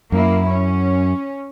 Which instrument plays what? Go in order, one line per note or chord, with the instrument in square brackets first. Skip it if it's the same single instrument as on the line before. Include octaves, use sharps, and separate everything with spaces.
[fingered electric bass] F#2 [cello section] A#3 E4
[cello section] C#4